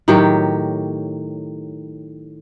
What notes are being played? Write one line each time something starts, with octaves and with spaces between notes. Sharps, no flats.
A2 D#3 F#3 G4